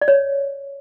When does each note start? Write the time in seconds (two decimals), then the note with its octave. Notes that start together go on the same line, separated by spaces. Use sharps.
0.02 D5
0.08 C#5